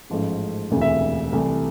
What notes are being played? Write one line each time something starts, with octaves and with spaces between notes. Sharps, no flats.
A1 G#2 F3 A3
E1 D2 C3 E3
E5
C2 C3 E3 A3